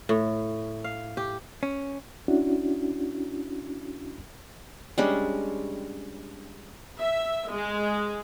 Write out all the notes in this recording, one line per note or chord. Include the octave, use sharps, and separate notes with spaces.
A2
F5
G4
C#4
C#4 D4 E4 F#4
G3 G#3 C#4 D4
E5
G#3